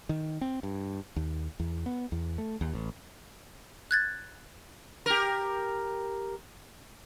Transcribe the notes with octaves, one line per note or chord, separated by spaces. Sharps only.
D#3
C4
G2
D#2
E2
B3
E2
A3
D#2
A1
F#6 G#6 A6
G4 A#4